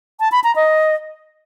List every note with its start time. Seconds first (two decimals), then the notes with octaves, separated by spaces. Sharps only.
0.20 A5
0.32 B5
0.44 A#5
0.56 D#5